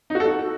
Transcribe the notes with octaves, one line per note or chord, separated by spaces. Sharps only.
D#4
F#4
A4
F#4